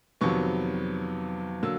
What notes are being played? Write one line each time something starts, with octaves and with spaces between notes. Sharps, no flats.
F2 C3 D#3 F#3 B3 C#6
D3 F#3 A#3 E6